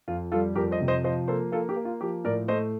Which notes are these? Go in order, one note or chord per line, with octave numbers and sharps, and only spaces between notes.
F2 F4
G3 F4 A4
F2 G4 A#4
C5 D#5
C3
C5 D#5
F3 C5 D#5
A#3 A4 C5
A#3 F4 A4
G4
A#3
F4
F3 G4
A2 A#4 D5
A3 C5 D#5